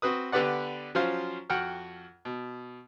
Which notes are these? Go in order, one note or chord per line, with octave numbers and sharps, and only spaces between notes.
C4 F#4 B4 D#6
D3 B3 G4 B4 D5 F#5
F3 F#3 C#4 F4 C5 F5
F2 F#4 F#5 G5 F6
B2